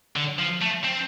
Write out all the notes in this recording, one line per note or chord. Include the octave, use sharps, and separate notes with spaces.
D3
F3
A3
C4